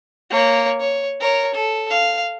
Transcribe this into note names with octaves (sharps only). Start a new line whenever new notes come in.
A#3 C#5
C#5
A#4 C#5
A4
F5